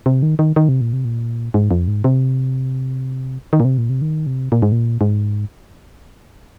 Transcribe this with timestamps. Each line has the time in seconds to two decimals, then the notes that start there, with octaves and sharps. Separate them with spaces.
0.06 C3
0.22 D#3
0.39 D#3
0.56 D#3
0.69 C3
0.81 A#2
0.93 C3
1.05 A#2
1.54 G#2
1.71 F2
1.88 G#2
2.04 C3
3.53 D#3
3.60 A#2
3.65 C3
3.78 A#2
3.89 C3
4.02 D#3
4.27 C3
4.52 A#2
4.62 G#2
4.72 A#2
5.01 G#2